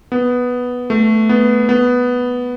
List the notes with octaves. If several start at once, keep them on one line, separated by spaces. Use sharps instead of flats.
B3
A3
B3
B3